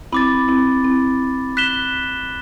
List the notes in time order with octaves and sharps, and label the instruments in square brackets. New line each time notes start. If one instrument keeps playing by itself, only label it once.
[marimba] C4 E4 [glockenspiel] B5 D6 A6
[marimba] C4 E4
C4 E4
[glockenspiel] F#6 B6 E7 G7